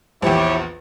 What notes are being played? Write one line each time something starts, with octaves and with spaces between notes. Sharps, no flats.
A#1 E2 E4 G4 C#5